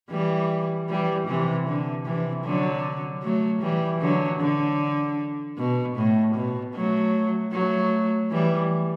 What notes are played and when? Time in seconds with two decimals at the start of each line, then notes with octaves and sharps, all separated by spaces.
0.10 E3 G3
0.89 E3 G3
1.27 C3 E3
1.67 D3
2.05 C3 E3
2.45 D3 F#3
3.23 F#3 A3
3.61 E3 G3
4.01 D3 F#3
4.39 D3
5.58 B2
5.96 A2
6.35 B2
6.74 F#3 A3
7.52 F#3 A3
8.31 E3 G3